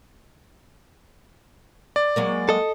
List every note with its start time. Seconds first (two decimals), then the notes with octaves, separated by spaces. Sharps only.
1.96 D5
2.16 F#3 G#3 A#3
2.49 A4 D#5